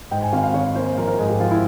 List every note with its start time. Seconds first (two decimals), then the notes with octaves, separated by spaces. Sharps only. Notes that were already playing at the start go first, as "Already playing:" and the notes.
0.11 G#2 G5
0.22 G#5
0.33 G#1 F5
0.43 F5
0.54 G#1 C#5
0.75 A#3 C5
0.97 F3 A#4
1.08 A#4
1.19 G#2 G#4
1.29 G4
1.40 F3 F4
1.51 E4